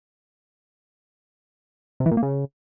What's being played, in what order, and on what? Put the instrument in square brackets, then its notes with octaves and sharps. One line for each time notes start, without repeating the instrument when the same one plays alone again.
[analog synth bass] C3
E3
A#2
A#3
C#3